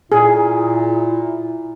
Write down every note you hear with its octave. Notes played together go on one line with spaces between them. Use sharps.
A#2 E4 G#4